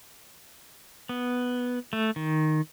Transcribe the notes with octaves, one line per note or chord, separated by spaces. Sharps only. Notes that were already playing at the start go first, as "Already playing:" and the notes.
B3
A3
D#3